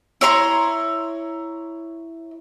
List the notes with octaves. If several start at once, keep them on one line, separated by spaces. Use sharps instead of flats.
E4 C#5 A#5 C6